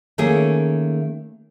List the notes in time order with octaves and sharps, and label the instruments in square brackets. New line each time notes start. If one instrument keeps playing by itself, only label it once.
[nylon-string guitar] D#3 A3 A#3 C#4 G#4